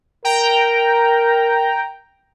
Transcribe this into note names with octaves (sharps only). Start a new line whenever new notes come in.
A#4 G5 A#5